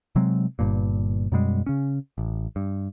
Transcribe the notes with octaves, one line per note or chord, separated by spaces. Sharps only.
C3 F#3 G#3 C4
G1 G2 A#2
F#2 B2 G3 G#3
C#3 C#4
A1
G2